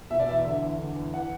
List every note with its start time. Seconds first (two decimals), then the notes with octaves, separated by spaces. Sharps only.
0.10 B2 E5
0.20 D5
0.27 E2 E5
0.44 D3 E5
0.62 E2
0.79 D3
0.96 E2
1.13 E3 F#5